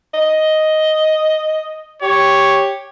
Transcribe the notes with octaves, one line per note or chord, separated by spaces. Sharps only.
D#5
G4 C#5